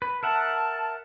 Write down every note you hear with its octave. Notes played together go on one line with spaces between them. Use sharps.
B4
A#4 E5 F#5 A5